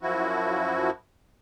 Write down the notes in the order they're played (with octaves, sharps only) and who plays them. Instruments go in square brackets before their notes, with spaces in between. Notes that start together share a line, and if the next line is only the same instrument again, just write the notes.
[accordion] F#2 F3 E4 F#4